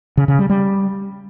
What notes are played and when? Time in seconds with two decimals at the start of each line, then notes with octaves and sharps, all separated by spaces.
0.17 C#3
0.28 C#3
0.39 G3
0.50 G3